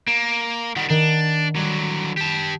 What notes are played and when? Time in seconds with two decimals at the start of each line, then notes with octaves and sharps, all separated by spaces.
0.07 A#3 E7
0.76 D#3 G3 F#5
0.90 D#3 D4
1.56 D3 F#3 G3 D#7
2.17 G4 A5